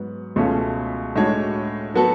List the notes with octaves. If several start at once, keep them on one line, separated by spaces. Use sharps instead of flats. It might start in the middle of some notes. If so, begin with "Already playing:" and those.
Already playing: G#2 F#3 B3
C#2 B2 A3 C#4 F4
A2 G#3 D4 F#4 C#5
F#3 B3 F#4 A4